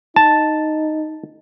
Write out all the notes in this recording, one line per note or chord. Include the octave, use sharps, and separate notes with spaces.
D#4 A5